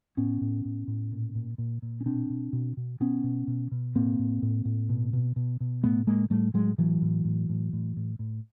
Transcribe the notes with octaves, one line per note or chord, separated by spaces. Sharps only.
A2 B3 C#4
A2
A2
A2
A#2
A#2
A#2
A#2
C#4
B2 C4 D4
B2
B2
B2
B2 B3 C#4
B2
B2
B2
A2 A#3 C4
A2
A2
A2
B2
B2
B2
B2
A2 A3 B3
A2 G#3 A#3
A2 G3 A3
A2 F#3 G#3
A2 E3 F#3
A2
A2
A2
A2
A2
A2